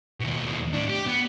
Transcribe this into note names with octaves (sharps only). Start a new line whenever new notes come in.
D#2 B2
A2 D4
G4
B3